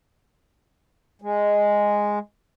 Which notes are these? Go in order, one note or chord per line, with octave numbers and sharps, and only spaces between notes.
G#3